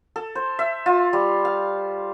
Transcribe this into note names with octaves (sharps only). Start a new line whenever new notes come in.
A4
C5
E5
F4
G3
F5